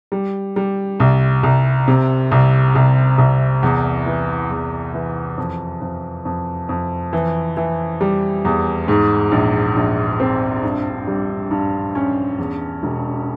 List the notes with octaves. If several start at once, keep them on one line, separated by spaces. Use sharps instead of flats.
G3
G3
C2
C2
C3
C2
C2
C2
E2
E3
E2
E3
F2
F2
F2
F2
E3
E3
G3
E2
G#2
A#1
A#1
C4
G2
G3
G2
C#4
E2
E1